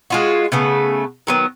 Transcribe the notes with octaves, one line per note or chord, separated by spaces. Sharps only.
G#3 F4 F#4
C#3 A3 B3
D#3 F#3 B3